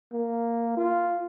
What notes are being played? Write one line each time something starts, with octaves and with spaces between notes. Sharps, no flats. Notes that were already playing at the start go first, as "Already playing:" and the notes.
A#3
F4